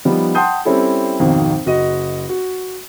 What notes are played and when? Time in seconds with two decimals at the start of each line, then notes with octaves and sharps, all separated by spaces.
0.05 F3 G3 B3 D#4
0.35 F#5 G5 A5 C6 D#6 G6
0.65 G3 C4 C#4 E4 A4
1.20 G#1 F2 B2 D#3
1.66 F#1 F#4 D#5
2.29 F#4